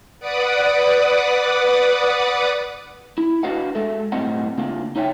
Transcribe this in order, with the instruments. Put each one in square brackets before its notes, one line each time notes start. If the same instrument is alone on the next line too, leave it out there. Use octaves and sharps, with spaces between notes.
[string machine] B4 D5 F#5 D6 D#6
[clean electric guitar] E4
D4 F#4 B4 D#5 F5 F#5
G#3 A4 E5
B1 A2 G3 C4 D#5 F#5
C#3 A#3 D4 F4
D#4 C#5 E5 F5 G5